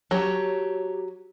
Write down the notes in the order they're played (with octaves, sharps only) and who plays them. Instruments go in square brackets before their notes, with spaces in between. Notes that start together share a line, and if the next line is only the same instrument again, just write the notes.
[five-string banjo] F#3 [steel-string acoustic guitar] G4 C#5 A5